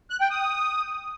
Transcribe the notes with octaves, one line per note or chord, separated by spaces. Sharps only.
F#6
G5
D#6